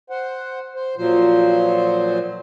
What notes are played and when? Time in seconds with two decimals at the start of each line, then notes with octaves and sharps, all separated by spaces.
0.10 C5 F#5
0.75 C5
0.97 A#2 F3 F#3 C5